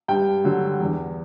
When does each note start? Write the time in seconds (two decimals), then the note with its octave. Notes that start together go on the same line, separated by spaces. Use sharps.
0.08 G2 G5
0.45 D3 F#3
0.80 E2